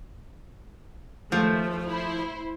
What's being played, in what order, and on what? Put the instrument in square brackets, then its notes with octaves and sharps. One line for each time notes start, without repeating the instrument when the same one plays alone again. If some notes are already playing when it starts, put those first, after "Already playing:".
[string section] D#2 A3 [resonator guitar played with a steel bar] F3
[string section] E4 C5